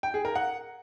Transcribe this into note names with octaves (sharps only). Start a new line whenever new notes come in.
G5
G#4
A#4
F#5